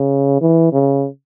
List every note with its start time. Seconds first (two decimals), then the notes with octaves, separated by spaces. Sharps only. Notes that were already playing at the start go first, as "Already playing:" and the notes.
Already playing: C#3
0.41 E3
0.73 C#3